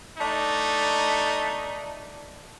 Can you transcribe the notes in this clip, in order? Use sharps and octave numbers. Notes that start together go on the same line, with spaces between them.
A3 D4 D#4